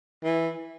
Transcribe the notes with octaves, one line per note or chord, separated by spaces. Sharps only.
E3